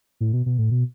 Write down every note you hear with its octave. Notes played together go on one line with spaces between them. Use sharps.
A2
B2
B2
A2
B2